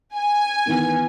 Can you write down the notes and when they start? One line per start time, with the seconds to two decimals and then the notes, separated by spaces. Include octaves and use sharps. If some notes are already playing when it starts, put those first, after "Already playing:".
0.15 G#5
0.66 D#3 E3 B3